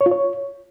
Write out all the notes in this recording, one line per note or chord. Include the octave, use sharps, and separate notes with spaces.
C#5
F4
C#5